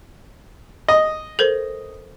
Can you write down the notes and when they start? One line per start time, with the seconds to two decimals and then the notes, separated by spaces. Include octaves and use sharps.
0.88 D#5
1.39 A4 A#4 C5